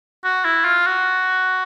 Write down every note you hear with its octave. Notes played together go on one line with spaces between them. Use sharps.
F#4
E4
F4
F#4